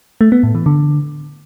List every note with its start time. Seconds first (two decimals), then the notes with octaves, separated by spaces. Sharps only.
0.21 A3
0.32 B3
0.43 A2
0.55 E3
0.66 D3